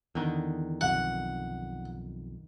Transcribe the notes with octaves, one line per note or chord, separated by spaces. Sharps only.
E2 D3 D#3
B1 F2 F#5